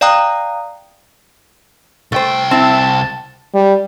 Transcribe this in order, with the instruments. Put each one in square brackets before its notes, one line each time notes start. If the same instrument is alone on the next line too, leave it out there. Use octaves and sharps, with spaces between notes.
[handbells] D5 F5 G5 A#5 D#6 F#6
[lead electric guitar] C2 G5 [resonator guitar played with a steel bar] A3 C5
[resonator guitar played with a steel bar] C4 E4 [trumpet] A5
[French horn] G3